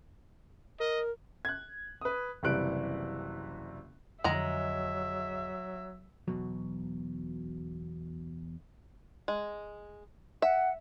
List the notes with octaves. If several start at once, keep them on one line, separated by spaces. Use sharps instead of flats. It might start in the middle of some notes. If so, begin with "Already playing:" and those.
A#4 D#5
F#6 G#6
B4 D#6
F#1 C3 E3 G3 F#6 D7
F2 D3 F#3 G#3 E5 A#5
E2 B2 F#3
G#3
E5 F#5